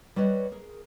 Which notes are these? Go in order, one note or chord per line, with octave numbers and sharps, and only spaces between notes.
G3 F#4 B4 C#5 D#5
G#4 A#4